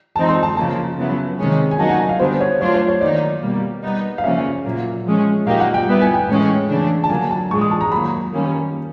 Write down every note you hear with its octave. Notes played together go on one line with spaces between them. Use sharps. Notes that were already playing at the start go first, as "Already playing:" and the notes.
E3 G#3 C4 D#4 A5
C6
A5
C#3 F3 A#3 A5
C#3 F#3 B3 E4
C3 D#3 G#3 C#4
G#5
F#3 A#3 D#4 F#4 A5
G#5
F5
D3 G3 B3 D4 C5
C#5
F#3 A3 D4 F4 C#5
C5
C#5
D#3 F#3 A#3 D#4 D5
B2 G3 A#3
G3 B3 D#4
F5
C#3 F3 A#3 C#4 E5
A#2 F#3 A#3
F3 G#3 C#4
A#2 F#3 A#3 D#4 G4 F5
F#5
G5
G3 B3 E4
G#5
G5
A2 E3 G#3 C#4
C#3 E3 A3 D4
A5
D3 F#3 A#3 G#5
A5
A2 E3 G#3 C#6
D#6
A5
A#5
D#3 F#3 A#3 B5
D#3 G3 A#3 C#4